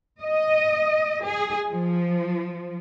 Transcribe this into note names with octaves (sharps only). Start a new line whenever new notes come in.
D#5
G#4
F3